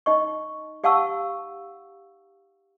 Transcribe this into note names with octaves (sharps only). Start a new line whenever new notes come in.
D#4 D#5 C#6
G4 F5 F#5 A5 C#6 E6